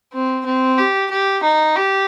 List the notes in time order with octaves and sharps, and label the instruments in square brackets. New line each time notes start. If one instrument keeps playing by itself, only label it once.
[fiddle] C4
C4
G4
G4
D#4
G4